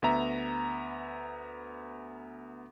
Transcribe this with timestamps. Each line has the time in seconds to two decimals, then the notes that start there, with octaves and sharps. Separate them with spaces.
0.02 D2 B3 E5 A#5